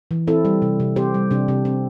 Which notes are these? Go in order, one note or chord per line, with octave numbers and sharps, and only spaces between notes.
E3
C4 E4 A4
G3
C3
C3
C4 G4 C5
G3
C3 D4
C3
C4